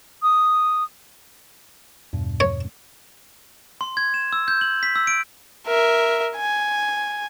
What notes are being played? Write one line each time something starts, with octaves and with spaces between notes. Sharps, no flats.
D#6
E2 G2 B2
C#5
C6
G#6
E7
E6
G6
F#7
B6
E6
D7
A#4 E5
G#5